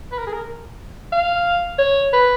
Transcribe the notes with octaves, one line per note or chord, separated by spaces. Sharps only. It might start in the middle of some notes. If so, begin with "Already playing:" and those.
B4
A#4
G#4
A#4
F5
C#5
B4